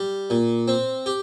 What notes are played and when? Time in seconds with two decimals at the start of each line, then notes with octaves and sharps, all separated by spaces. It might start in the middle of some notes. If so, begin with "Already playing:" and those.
Already playing: G3
0.30 A#2
0.68 C4
1.06 G4